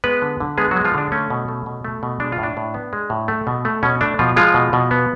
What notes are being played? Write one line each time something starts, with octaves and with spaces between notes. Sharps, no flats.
G#3 B3 B4
D3
D3
G#3 B3 G#4
F#3 F#4
G#3
F3 F4
D3 D4
A3 C#4
B2
A3
B2
A3
B2
G#3 D4
F4
A2 D4
A2
B3
G#3
A2
A3
B2
A3
B2 C#4
A3 D4
B2 F3 F4
F3 G#3 F4
B2
B2
B3